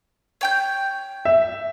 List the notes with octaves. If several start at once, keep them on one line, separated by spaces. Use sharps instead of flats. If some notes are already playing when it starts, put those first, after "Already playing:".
C#5 G5 G6
E5